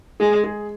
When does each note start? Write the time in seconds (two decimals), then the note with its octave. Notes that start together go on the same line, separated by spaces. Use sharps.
0.20 G#3 G#4
0.44 G#4